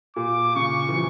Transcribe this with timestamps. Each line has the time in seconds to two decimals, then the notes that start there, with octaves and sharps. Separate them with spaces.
0.16 A#2 D6
0.56 C#3 C#6
0.89 E3
0.94 F3